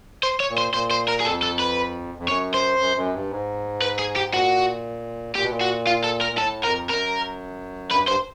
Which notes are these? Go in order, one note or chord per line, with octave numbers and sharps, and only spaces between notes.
C5
C#5
A#2
C5
A#2 C5
C5
A#4
G#4
F2 A4
A4
B4
F2
F#2 C#5
C5
F#2
F#2
G2
G#2
B4
G#4
G4
A#2 F#4
A#2 G4
B2
A#2
F#4
F4
A4
A#4
A#2
A2 A4
F2 A#4
F#2 A#4
G2 B4
F#2
G2 C5